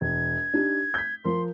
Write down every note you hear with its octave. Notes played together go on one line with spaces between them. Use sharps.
E1 G#6
D4 D#4 G4
G6 B6
F3 A#4 C6